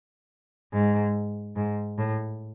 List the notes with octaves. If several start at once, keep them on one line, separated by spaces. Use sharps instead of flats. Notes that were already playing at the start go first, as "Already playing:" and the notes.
G#2
G#2
A2